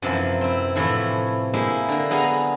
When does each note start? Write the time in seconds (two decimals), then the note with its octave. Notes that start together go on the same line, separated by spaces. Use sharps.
0.02 F#2 C3 E3 F3
0.41 C4 E4
0.75 A2 C3 E3 F3 E4
1.54 G#3 A#3 E4 G4
1.88 D3 A#3
2.10 F#3 B3 G#4 F5 G#5 A#5